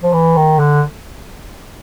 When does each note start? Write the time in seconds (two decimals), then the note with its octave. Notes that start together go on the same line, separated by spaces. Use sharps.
0.03 F3
0.13 E3
0.36 D#3
0.59 D3